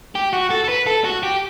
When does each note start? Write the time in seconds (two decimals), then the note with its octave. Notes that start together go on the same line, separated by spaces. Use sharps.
0.15 G4
0.33 F#4
0.50 A4
0.64 A4
0.68 B4
0.86 A4
1.04 F#4
1.23 G4